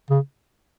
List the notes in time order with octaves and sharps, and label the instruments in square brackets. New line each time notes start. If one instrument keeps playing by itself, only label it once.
[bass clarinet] C#3